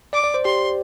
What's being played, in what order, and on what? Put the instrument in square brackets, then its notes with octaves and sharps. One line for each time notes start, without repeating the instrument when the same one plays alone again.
[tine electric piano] D5 [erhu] D6
[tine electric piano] D5
C5
[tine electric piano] G4 [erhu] C6